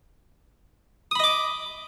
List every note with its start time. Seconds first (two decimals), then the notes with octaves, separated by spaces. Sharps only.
1.11 D#6
1.15 B5
1.20 D#5
1.24 D6